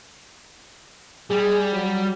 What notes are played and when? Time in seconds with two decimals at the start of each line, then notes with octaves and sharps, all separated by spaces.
1.30 G3 G#4
1.73 F#3